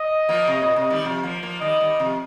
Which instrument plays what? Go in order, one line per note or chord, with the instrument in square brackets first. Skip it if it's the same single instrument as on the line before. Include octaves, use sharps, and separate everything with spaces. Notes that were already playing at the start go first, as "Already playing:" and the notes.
Already playing: [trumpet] D#5
[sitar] F3 A#3
C3
A#2
C3
D#3 G3
C3 F3
F3 A#3
F3 A#3
[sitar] D#3 G3 [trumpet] D#5
[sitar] D#3 G3
C3 F3